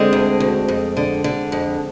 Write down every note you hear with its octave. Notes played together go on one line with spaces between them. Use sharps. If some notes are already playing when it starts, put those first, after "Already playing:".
Already playing: D3 G#3 C4
D2
D2
F2
D3
D3
F2